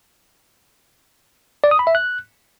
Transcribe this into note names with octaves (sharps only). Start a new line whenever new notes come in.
D5
D#6
B5
E5
F#6